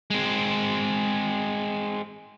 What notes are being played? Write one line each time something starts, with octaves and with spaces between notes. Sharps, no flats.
G#3 C4